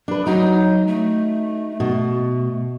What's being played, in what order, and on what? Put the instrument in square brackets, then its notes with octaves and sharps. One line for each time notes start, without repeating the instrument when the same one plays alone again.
[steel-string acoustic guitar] D4 B4
[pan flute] F#3 [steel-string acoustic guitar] D#4 F#4
[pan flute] A3
[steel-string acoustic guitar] B2